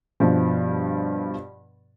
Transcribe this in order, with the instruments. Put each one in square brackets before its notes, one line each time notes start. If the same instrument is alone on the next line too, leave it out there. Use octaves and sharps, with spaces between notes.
[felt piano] G2 B2 F3